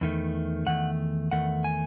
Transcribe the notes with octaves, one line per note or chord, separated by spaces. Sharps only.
E2 D#3 A3
E2 D#3 A3 F#5
E2 D#3 A3 F#5
G#5